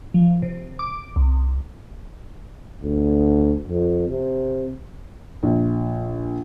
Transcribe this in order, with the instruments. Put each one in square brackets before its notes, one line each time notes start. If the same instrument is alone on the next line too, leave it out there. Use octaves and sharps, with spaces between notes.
[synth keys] F3
C3
D6
C2
[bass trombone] D2
F2
C3
[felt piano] A#1